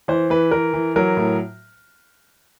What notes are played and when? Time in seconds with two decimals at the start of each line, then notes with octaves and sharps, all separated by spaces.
0.08 E3 C5
0.30 E3 B4
0.51 E3 A#4
0.74 E3
0.96 F#3 A#4
1.17 A2